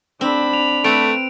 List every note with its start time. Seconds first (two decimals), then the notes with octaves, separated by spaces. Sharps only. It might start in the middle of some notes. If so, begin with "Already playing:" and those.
0.21 C4 D4 B5
0.54 F7
0.84 A3 C4 B4 D7